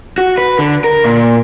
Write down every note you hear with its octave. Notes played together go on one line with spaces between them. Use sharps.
F#4
B4
D3
A#4
A#2